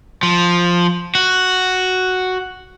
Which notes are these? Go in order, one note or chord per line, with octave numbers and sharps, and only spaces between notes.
F3
F#4